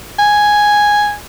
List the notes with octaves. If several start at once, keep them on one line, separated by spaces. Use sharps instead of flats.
G#5